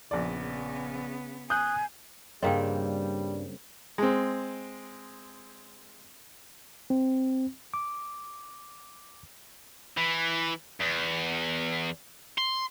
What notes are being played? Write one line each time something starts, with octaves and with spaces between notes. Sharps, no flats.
A#1 C#3 B3 D5
G#5 D#6 F#6 G6
G2 C#3 G3 A#3 C4 D#5 F5 G5
G#3 C4
C4
D6
E3
E2
C6